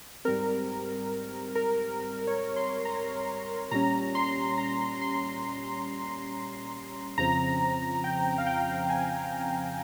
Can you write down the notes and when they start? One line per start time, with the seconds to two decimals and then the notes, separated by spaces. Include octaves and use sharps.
0.25 G#2 G3 C4 A#4
1.55 A#4
2.27 C#5
2.56 C6
2.85 A#5
3.71 A#2 G3 C#4 A#5
4.15 C6
4.58 A#5
5.01 C6
7.18 F2 C#3 F3 C4 A#5
8.04 G5
8.38 F5
8.47 G5
8.90 G#5